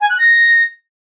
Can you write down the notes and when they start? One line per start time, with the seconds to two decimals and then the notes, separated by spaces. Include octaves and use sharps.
0.01 G#5
0.10 F#6
0.19 A#6